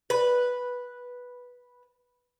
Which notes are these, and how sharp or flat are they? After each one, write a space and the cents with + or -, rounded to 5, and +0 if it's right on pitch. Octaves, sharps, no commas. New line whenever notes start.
B4 -5